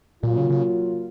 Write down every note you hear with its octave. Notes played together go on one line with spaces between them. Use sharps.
A#2 F#3 A#3 F4
C#3
C#3